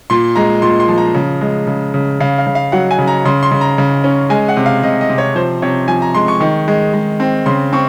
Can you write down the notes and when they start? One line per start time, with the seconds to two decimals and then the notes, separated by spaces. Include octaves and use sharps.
0.10 A#2 C6
0.36 G#3 A#5
0.62 A#2 C6
0.80 C6
0.88 F3
0.98 A#5
1.14 C#3
1.41 G#3
1.67 C#3
1.94 C#3
2.20 C#3 F5
2.38 F5
2.47 C#3
2.55 F5
2.72 F#3 F#5
2.91 G#5
2.99 C#3
3.08 A#5
3.25 C#3 C6
3.43 C6
3.51 C#3
3.61 A#5
3.78 C#3
4.04 C#4
4.30 G#3 G#5
4.49 F#5
4.57 C3
4.66 F5
4.83 C3 D#5
5.01 D#5
5.09 C3
5.18 C#5
5.35 F3 C5
5.62 C3 C#5
5.88 F3 G#5
6.02 A#5
6.15 G#3 C6
6.28 C#6
6.40 D#3
6.68 G#3
6.94 G#3
7.20 C4
7.46 C#3 C6
7.73 C4 C#6